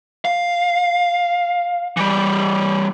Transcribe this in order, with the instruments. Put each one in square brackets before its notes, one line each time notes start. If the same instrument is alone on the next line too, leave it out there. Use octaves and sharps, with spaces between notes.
[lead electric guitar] F5
E3 G3